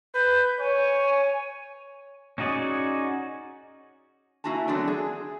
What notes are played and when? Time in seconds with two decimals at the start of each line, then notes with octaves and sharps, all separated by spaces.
0.15 B4 G6
0.59 C#5 G#5
2.38 C#4 D#4 F#4 G#4 D5
4.44 A#3 E4 F#4 G#5 A5
4.68 D3 F#3 A3 B3 C4 D4
4.88 G#4